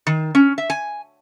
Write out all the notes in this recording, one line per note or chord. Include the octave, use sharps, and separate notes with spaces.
D#3
C#4
E5
G#5